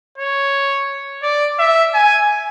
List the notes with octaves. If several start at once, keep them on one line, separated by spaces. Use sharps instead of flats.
C#5
D5
E5
G#5